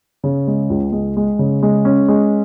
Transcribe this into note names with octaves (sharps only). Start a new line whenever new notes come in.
C#3
G#3
C#2
G#3
G#3
C#3
G#3
C#4
G#3